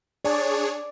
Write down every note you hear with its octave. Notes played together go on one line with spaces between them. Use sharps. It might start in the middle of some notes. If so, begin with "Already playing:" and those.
D4 G#4 C#5 D5